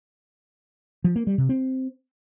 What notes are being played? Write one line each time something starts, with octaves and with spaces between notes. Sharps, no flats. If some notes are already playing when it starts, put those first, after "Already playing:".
F3
A#3
G3
C3
C4